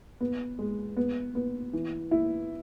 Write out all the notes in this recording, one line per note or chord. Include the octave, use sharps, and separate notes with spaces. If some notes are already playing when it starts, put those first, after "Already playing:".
B3
G#3
B3
B3
E3
E4